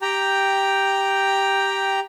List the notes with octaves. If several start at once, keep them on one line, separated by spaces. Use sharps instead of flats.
G4 G5 A#5